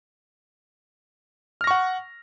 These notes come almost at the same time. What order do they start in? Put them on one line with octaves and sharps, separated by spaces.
F6 A#6 C#6 F#5